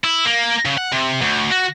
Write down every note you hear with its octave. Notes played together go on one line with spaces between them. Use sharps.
E4
A#3
C#3
F#5
C3
D2
F#4